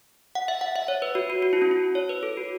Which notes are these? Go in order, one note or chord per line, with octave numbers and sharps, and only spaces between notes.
F#5
E5
F#5
E5
C#5
B4
F#4
F#4
F#4
E4
C#4
E4
C#5
B4
A4
F#4